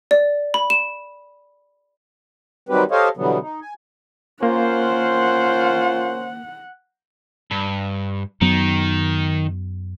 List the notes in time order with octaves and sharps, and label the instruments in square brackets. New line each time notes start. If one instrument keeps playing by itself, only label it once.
[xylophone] D5
B5
E7
[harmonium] D#3 F#3 G3 C4 G4 B4
G4 A4 C5 C#5 D#5 F5
B2 D3 E3 F#3 G3 B3
D#4
G#5
[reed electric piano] A#3 [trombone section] C#4 A#4 C5 [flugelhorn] F4 [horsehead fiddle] F#5
[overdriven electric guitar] G2
[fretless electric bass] F#2 F#3 B3 [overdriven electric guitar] D#3